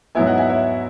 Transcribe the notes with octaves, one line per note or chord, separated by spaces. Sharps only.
G#2 F#3 B3 E4 E5 G#5
D#5 F#5
E5 G#5
C#5 E5